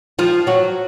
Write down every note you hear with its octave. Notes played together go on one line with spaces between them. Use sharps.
F3 F4
F#3 F#4